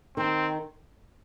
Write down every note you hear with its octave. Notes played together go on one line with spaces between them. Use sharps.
D#3 C4